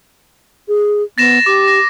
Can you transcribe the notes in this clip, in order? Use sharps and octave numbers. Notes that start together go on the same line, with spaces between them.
G#4
B3 A6 A#6 E7
G4 D6
A#6